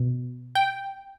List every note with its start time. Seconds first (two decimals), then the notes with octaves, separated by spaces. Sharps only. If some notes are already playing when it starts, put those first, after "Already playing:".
Already playing: B2
0.55 G5